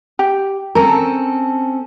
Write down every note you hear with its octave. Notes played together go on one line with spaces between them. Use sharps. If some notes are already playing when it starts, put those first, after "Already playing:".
G4
C4 C#4 A4 A#4